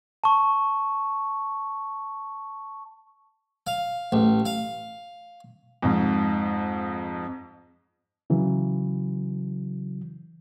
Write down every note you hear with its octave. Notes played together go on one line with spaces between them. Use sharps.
A5 C#6
F5
A1
F5
F2 G#2
C#3 E3 F#3